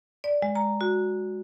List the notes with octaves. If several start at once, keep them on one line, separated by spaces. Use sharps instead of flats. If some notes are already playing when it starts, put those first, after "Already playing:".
D5
G#3
A#5
F#4